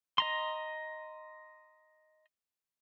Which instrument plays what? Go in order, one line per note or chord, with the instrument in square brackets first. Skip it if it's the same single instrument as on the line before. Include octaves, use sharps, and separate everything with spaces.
[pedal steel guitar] D#5 A#5 C6